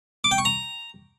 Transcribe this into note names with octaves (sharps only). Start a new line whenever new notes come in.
D6
G5
C#6
A#5